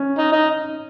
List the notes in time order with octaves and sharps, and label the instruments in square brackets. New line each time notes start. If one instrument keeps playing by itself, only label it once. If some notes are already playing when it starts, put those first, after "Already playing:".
Already playing: [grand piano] C#4
[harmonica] D#4
D#4